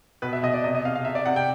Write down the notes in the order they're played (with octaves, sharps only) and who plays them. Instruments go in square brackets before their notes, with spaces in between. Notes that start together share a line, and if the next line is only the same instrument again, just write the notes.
[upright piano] B2 B4
E5
B2 D#5
D5
C3 D#5
D#5
C3 F5
F5
C3 E5
D5
C3 F#5
G5